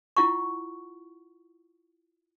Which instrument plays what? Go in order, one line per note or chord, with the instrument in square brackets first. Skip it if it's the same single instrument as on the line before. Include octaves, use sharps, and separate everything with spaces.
[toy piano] E4 F4 F#5 C#6